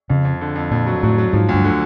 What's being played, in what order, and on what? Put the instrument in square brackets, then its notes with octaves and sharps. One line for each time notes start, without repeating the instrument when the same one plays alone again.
[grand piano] F2 [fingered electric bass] C#3
[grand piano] F2
D3
F2
[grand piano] F2 [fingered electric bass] A#2
[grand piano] F#3
[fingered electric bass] A2 [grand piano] F#3
[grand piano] F#3
[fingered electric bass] G#2 [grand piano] F3
[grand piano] D2 [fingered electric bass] G2
[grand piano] D3